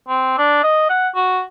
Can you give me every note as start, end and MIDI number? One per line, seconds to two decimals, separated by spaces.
0.09 0.36 60
0.38 0.59 62
0.63 0.85 75
0.89 1.08 78
1.15 1.41 66